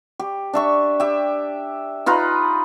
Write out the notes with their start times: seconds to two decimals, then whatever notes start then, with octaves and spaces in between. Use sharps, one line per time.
0.20 G4
0.53 D4 E5 C#6
1.00 G4 E5
2.06 D#4 F4 B4 A#5